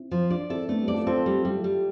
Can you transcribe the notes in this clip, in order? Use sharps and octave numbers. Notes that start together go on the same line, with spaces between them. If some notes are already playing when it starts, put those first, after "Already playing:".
Already playing: C4 E4
F3
D4 F4 D5
C4 E4 A4
A3 B3 D4
G3 B3
D5
F4 A4
C4 F4 A4
G3
G3 E4 G4
G3